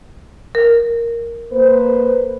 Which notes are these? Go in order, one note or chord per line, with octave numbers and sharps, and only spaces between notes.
A#4
A#3 B4 C5